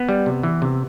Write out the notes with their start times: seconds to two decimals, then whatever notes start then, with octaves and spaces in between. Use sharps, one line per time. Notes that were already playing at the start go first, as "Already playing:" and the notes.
Already playing: B3
0.09 G3
0.26 C3
0.43 E3
0.62 C3